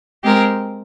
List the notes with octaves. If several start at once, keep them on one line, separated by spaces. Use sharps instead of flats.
G#3 C4 G4 A#4